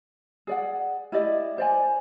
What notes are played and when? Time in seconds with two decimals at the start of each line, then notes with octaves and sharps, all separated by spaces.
0.47 G#4 D5 F#5
1.12 E4 G4 D5 D#5
1.58 C5 D5 G#5